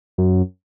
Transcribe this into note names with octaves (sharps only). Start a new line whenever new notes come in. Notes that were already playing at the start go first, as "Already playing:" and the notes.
F#2